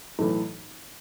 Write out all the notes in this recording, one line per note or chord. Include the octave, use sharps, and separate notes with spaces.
B1 A2 E3